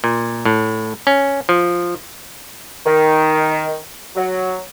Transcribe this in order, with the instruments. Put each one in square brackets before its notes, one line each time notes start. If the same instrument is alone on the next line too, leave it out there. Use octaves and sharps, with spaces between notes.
[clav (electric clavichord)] A#2
A2
C#4
F3
[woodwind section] D#3
F#3